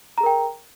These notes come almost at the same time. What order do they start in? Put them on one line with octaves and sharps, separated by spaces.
A#5 G#4 A#4 G5